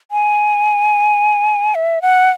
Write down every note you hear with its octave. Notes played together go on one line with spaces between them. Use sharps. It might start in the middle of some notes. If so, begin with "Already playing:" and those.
G#5
E5
F#5